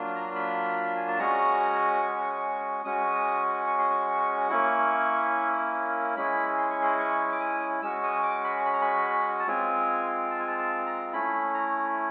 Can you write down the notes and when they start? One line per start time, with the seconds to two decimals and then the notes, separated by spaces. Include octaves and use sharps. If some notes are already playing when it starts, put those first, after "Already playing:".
Already playing: F#3 A#3 D4 F4
0.16 A#5
0.35 B5
0.96 G#5
1.08 A5
1.19 G#3 C#4 F#4 A#5
2.02 C#6
2.85 G#3 C#4 F#4 D#6
3.67 C#6
3.79 C6
3.90 C#6
4.50 A#3 C#4 E4
6.17 G#3 C#4 E4 B5
6.58 C6
6.70 C#6
6.82 C6
6.99 C#6
7.32 D6
7.40 D#6
7.82 G#3 C#4 F#4 E6
8.03 D#6
8.23 D6
8.44 B5
8.65 B5
8.73 A#5
8.81 B5
9.40 A5
9.47 G#3 C4 F4 G#5
10.31 A5
10.40 G#5
10.48 A5
10.58 A5
10.86 A#5
11.13 A3 C#4 E4 B5
11.54 A#5